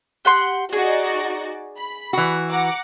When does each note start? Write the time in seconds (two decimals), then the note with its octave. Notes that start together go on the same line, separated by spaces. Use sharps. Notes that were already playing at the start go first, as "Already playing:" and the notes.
0.25 G4 F#5 C6
0.73 D#4 F#4 G#4 D5
1.77 B5
2.13 E3 F#4
2.49 F#5 A#5 D6